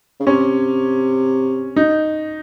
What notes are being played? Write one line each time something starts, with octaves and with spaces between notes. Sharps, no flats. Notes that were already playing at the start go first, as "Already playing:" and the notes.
C#3
C3 C#4
D#4